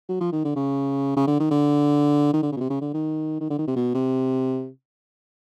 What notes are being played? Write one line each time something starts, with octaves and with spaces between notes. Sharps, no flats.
F#3
F3
D#3
D3
C#3
C#3
D3
D#3
D3
D#3
D3
C#3
B2
C3
C#3
D3
D#3
D#3
D3
D#3
C3
B2
C3